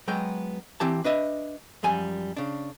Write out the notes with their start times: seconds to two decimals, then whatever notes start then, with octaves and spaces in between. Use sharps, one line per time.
0.08 F#3 G#3 B3 G5
0.80 E3 C4 G4 A5
1.04 D4 B4 D#5 E5
1.83 F#2 F3 G3 G#5
2.37 C#3 D4